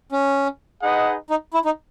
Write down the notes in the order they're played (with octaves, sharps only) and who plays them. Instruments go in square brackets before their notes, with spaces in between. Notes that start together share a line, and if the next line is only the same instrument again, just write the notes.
[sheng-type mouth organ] C#4
[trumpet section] D#4 G#4 B4 D#5 F#5
[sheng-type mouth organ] D#4
E4
D#4